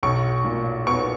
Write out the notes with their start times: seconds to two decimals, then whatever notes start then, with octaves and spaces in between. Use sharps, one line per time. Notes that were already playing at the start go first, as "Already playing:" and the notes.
0.03 B1 C#6
0.45 A#2
0.87 B3 C#6